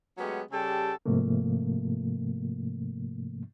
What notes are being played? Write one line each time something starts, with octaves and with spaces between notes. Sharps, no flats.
F#3 G#3 A3 B3 C#4 G4
C#3 G3 G4 A4 G5 A5
G#2 C3 F3 A3 A#3